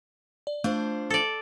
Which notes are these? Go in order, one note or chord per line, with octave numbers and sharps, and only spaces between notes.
D5
A3 D4 F4 C5 F5
A4 D5